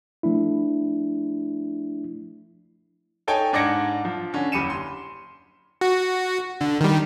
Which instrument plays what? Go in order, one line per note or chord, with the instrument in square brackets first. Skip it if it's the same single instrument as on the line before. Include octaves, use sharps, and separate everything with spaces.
[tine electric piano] F3 A3 D4 E4
[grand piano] D#4 A4 C#5 G5 G#5
G#2 D4 D5 G#6 A#6 C#7
F3
D3 C#4
F#1 G4 B5 C#7 D#7 E7
C6
[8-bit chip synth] F#4
D3
D#3 G3